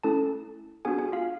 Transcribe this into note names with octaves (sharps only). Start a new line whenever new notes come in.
A3 C#4 E4 A4 A5
B3 D4 F#4 G#4 G#5
G#4 G#5
F4 F5